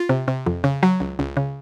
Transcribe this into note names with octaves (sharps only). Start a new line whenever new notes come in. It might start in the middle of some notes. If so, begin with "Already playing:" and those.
Already playing: F4
C3
C3
F2
C#3
F#3
C#2
C#2
C#3